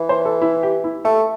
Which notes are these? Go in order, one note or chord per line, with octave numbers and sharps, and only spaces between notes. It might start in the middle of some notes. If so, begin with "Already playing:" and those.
Already playing: E3
C5
A4
E4
G4
E4
A3 A4